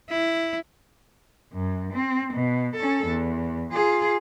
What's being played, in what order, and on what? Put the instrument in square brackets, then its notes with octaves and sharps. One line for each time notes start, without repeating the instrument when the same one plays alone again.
[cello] E4
F#2
C4
B2
C#4 A4
E2
F4 G#4